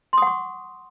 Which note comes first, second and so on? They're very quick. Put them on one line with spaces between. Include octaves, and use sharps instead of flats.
C6 D#6 F#5 C#6